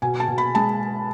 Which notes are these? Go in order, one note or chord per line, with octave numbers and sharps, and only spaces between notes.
B2 G#5
A5
B2
B5
G#3 A5